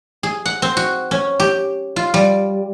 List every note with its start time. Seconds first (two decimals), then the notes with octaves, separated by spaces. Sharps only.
0.23 G#4
0.46 F#5
0.62 C4
0.77 F#4
1.11 C#4
1.40 G4
1.96 F4
2.14 G3